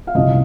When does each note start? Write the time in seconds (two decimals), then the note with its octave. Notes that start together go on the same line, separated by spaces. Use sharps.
0.07 F5
0.15 C2 C3 F3 D#5